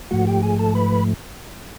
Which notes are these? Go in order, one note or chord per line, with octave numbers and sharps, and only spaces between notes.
G#2 F3 A3 F#4 F#5
G4 G5
G#4 G#5
A4 A5
B4 B5